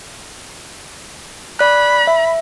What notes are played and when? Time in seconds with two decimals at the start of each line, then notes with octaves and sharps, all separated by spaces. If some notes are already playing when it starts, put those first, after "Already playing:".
1.59 D5 B5 F#6
2.07 E5